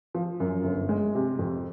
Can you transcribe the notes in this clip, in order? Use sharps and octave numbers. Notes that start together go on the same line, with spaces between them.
F3
F#2
G1
G#3
C3
F2